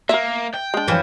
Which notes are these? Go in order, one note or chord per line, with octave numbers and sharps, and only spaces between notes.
A#3 A#4 E5
G5
G#3 D4
F#2 E3 F3